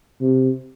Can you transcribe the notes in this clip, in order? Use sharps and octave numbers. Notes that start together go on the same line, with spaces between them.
C3